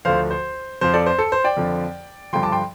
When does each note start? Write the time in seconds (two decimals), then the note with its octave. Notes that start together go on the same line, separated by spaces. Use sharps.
0.05 D2 D3 F3 C5 F5
0.31 C5
0.81 F2 F3 C5
0.94 A4 D5
1.06 C5
1.19 A4
1.32 C5
1.44 D5 G5
1.57 F2 D3 F3
2.33 G2 D3 F3 G5 C6
2.43 A5 D6
2.52 G5 C6